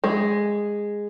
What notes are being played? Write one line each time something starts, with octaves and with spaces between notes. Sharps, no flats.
G#3